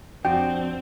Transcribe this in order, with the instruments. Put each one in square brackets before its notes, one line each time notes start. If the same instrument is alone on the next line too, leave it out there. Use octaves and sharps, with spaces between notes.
[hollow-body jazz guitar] F2 D4 F#4 [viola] C4 [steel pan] G5